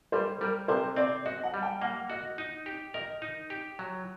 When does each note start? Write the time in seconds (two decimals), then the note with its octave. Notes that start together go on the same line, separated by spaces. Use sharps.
0.12 G3 C5
0.41 G3 A#4
0.68 C3 C5
0.96 C4 D5
1.25 F#4 D#5
1.43 F#5
1.54 G3
1.63 G5
1.82 A#3 F#5
2.10 F#4 D#5
2.38 D#4
2.66 G4
2.94 A#4 D#5
3.22 D#4
3.50 G4
3.79 F#3